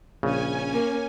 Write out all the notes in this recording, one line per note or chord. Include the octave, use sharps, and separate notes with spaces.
A#1 C#3 C#4 G#5
A#3